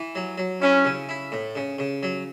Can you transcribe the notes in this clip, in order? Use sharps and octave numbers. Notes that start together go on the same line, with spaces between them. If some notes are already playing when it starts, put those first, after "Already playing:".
Already playing: E3
F#3
F#3
C#4 E4
C#3
E4
A2
C#3
C#3
F#3